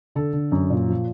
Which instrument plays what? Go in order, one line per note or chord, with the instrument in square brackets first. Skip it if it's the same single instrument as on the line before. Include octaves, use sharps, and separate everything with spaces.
[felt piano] D3 A4
D3
F#2
A#2
F3